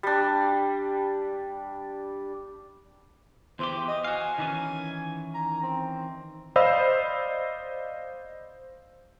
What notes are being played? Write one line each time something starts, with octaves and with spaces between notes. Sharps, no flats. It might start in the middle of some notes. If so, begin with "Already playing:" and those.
G3 D4
E2 E3 G4 C5
D#5
F#4 F5 G#5
D#3 E3 C#4
A#5
C4
C5 D5 D#5 F5 B5 E6